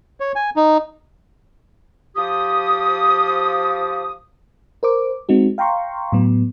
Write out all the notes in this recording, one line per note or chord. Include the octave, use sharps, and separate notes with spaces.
C#5
G#5
D#4
F3 G4 D#6
A#4 C5 D6
G#3 C4 D#4 F#4
F5 G5 A#5 C6 C#6
A2 F#3 B3